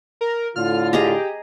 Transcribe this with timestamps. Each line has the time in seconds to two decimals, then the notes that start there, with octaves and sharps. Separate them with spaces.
0.21 A#4
0.56 A2 D3 F4 F6
0.93 G4 G#4 D#5 A#5